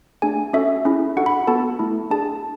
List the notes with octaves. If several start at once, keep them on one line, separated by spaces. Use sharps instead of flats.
A3 D4 G#4 G#5
C#4 F#4 A4 E5
C#4 E4 G#4
D4 F#4 A4 F#5
B5
B3 F#4 A4 A5
A3 E4 A4
D4 G#4 A5